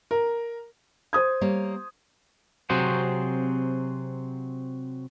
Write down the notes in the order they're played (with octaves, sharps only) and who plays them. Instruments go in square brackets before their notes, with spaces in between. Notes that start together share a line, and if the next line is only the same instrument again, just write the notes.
[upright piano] A#4
[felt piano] C5 D#6 G#6
[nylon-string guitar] G3 A#3 C#5
[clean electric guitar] C3 F#3 C4 F#4 G#4 C5